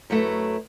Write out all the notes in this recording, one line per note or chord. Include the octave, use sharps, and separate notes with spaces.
F#2 F#3 A3 E4 B4